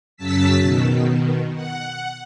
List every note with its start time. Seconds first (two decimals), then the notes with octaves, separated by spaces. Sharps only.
0.17 F#2 C#3 F#3 A5 E6 B6
0.58 B2 D#3
1.54 F#5